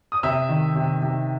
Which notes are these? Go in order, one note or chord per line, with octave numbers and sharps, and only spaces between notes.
D#6
C3 E5 E6
D#3
C3
C3